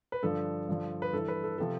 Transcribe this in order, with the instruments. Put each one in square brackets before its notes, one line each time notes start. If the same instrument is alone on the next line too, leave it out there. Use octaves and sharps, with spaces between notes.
[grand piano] B4
G2 D3 F3 A4
G2 D3 F3
B4
G2 E3 A4
B4
A4
C3 F3 A4